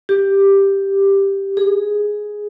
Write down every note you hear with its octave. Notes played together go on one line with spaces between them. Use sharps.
G4
G#4